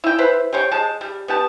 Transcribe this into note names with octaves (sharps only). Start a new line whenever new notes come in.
E4 G5
E4 B4 C5
G4 C5 C#5 G5
G#3 A5
G3
B3 G4 A5